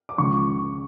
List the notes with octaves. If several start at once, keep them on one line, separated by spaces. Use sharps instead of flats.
D6
C#2 C#3 F3 C#6